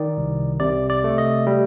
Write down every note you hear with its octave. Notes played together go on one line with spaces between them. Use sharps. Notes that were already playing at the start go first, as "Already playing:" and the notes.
Already playing: D#3 D5
C2
C3 D5
D5
A3
D#5
G3